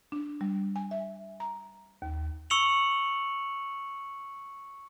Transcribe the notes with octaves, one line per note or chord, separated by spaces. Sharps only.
D4
G3
G#5
E5
A#5
D#2
C#6 E6 C#7 F7 F#7